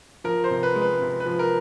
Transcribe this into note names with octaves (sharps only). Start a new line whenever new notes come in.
F3 A#4
C5
C3
B4
G#3
B4
C3
B4
F3
A#4